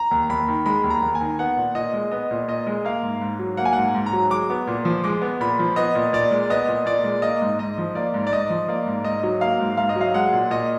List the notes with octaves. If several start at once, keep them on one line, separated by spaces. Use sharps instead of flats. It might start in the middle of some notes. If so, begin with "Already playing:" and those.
Already playing: A#5
D#2
D#2 B5
D#3
G#3 B5
D#2
A#5
D#2
G#5
D#3
B3 F#5
A#2
A#2 D#5
G#3
B3 D#5
A#2
A#2 D#5
G#3
A#3 F5
G#2
G#2
F#3
A#3 F#5
G#5
G#2 F#5
G#2
A#5
F#3
G#3 D6
B3
A#2
F3
G#3 D6
B3
A#2 B5
F3
B3 D#5
A#2
A#2 D5
G#3
B3 D#5
A#2
A#2 D5
G#3
A#3 D#5
G#2
G#2 D#5
F3
A#3 D5
G#2
D5
G#2 D#5
F3
A#3 D5
G#2
G#2 D#5
F#3
A#3 F5
G#2
G#2 F5
D#5
F#3 F5
G#3 F#5
A#2
A#2 D#5